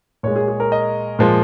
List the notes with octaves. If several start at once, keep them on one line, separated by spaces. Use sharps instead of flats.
A#2 G#3 C#5
G#4
G#4
A#4
D#5
A#2 F3 G#3